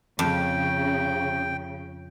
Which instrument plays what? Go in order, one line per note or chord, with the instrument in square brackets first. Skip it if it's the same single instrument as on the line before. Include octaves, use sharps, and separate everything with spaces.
[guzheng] F2 [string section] C#3 [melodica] G5